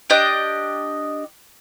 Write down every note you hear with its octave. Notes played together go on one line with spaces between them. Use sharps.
D4 G4 D#5 G5